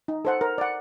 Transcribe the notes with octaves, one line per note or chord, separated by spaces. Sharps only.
D#4
A4 C5 F#5
A#4
D5 F#5